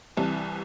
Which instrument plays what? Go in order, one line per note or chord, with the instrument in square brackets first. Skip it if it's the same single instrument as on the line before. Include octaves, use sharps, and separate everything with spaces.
[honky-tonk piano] C2 C3 E3 A5